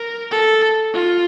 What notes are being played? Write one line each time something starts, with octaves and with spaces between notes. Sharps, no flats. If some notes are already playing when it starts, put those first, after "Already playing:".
Already playing: A#4
A4
F4